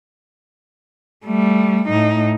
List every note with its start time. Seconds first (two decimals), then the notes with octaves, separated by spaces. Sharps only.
1.26 G3 A3
1.89 A2 D#4